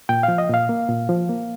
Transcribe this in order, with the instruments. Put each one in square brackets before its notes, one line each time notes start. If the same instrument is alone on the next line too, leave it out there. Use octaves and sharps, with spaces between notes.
[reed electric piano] A#2 G5
F3 F5
D#5
A#2 F5
A#3
A#2
F3
A#3